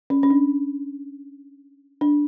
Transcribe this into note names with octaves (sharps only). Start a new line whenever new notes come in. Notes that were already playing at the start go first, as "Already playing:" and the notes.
C#4
C#4
D4
D4